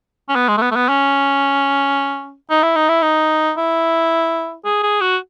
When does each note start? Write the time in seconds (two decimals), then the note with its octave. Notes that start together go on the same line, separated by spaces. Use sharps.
0.29 C#4
0.35 B3
0.48 G#3
0.57 A3
0.62 B3
0.71 A3
0.75 B3
0.89 C#4
2.50 D#4
2.63 E4
2.76 D#4
2.88 E4
3.02 D#4
3.57 E4
4.65 G#4
4.83 G#4
5.01 F#4